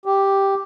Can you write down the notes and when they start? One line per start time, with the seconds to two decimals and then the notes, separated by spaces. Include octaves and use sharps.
0.06 G4